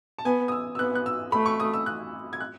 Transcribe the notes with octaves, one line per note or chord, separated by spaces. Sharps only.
A5
B3 G#5
D#6
E6
E6
B3 F#6
F#6
E6
A3 B5
C#6
D#6
E6
F#6
G#6
F#6